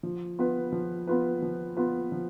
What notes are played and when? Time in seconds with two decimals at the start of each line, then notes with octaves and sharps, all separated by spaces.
0.03 F3
0.39 B3 F4 B4
0.72 F3
1.07 B3 F4 B4
1.42 F3
1.77 B3 F4 B4
2.12 F3